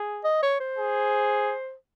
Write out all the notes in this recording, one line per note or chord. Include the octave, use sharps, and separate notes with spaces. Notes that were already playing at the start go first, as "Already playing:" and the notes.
Already playing: G#4
D#5
C#5
C5
G#4